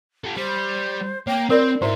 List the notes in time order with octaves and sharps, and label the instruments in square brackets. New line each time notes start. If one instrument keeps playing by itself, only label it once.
[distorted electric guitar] G4 A4
[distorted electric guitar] G3 [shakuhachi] C5
[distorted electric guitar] A#3 [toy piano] C#5 [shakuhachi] G5
[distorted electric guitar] C4 [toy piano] F4 A#4 D5 [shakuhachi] C5
[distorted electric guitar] G#2 D#4 [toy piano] E4 F#4 C5 [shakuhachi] E5